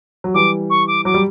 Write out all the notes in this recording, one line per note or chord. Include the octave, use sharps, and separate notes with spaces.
F#3
E3 G3 D6
C#6
D6
F#3 D6
G3